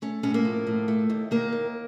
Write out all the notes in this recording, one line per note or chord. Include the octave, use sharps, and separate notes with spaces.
A3 C#4
A2 C#4
A#3
F3
A2
A3
D#2
D#3 A#3
D#2